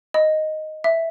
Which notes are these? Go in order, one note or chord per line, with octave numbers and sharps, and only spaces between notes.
D#5
E5